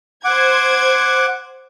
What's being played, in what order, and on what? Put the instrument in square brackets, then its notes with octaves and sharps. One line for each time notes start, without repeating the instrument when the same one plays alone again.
[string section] C5 G#6 [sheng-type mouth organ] F#5 D6